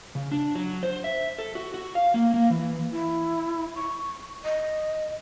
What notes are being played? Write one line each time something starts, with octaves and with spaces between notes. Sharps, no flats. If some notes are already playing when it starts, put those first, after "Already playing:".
C#3
D4
F#3
C5
E5
A4
F#4
F#4
F5
A#3
A#3
E3
E4
C#6
D#5